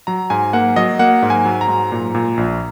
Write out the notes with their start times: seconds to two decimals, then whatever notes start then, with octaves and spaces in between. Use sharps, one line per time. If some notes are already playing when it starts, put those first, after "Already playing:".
0.07 F#3 A#5
0.30 G#2 G#5
0.53 A#3 F#5
0.76 F#3 D#5
0.99 A#3 F#5
1.22 G#2
1.30 G#5
1.45 F#3
1.61 A#5
1.68 G#2
1.92 A#2
2.15 A#2
2.37 A#1